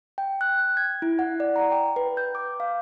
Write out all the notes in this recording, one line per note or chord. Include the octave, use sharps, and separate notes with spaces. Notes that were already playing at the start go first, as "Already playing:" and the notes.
G5
F#6
G#6
E4
F#5
D5
A#5
G5
B4
G6
D6
F5